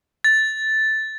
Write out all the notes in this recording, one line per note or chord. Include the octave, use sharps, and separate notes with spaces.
A6